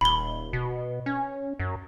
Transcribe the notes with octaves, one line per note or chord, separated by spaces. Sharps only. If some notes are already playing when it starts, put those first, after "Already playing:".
D#1 B5 G7
B2
C#4
F#2